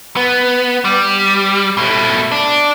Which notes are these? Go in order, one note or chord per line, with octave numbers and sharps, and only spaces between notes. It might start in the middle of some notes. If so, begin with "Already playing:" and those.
B3
G3
B2 A3
D4